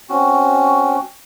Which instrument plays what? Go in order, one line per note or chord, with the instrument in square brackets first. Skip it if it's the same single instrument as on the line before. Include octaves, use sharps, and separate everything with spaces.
[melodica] C4 C#4 F#4